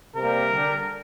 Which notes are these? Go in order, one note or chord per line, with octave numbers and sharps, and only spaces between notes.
C3 G3 A#3 A#4
D3 G3 D4